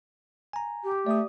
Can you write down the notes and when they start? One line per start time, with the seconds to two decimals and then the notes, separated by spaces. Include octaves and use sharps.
0.53 G#5 A#5
0.83 G4
1.06 A3 D5 D#6